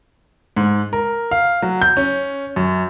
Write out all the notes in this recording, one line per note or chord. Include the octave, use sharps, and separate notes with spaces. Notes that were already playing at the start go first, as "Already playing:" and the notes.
G#2
A#4
F5
F#3
G6
C#4
F#2